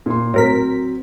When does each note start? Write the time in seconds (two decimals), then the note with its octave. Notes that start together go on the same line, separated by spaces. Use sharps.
0.06 A#2 C6
0.34 A2 F#3 C4 A#4 B6